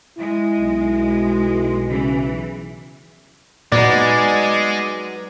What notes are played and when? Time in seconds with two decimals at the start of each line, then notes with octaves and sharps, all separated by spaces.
0.18 G#3 E4
0.60 B1
1.90 C#3 E3
3.72 A#2 F#3 G#3 B3 D#4 D5